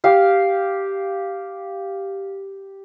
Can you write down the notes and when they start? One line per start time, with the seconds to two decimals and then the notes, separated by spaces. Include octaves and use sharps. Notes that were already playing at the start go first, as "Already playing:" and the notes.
0.04 G4 F5